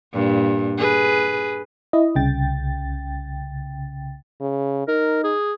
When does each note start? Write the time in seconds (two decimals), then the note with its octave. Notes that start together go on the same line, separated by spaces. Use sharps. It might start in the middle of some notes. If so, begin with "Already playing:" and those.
0.13 G2 A#2
0.78 G#4 B4
1.93 E4 D#5
2.16 C2 C#3 G5 A6
4.41 C#3
4.88 D#4 A#4
5.24 G#4